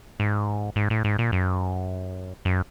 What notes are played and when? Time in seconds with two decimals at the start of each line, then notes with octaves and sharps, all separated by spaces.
0.20 G#2
0.76 G#2
0.90 A2
1.04 G#2
1.19 A#2
1.32 F#2
2.45 F#2